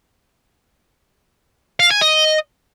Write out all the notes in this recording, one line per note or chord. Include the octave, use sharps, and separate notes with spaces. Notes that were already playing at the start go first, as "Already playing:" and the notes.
F5
G#5
D#5